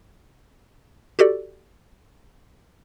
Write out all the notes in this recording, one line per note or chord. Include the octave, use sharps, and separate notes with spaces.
F#4 G4 A4 D5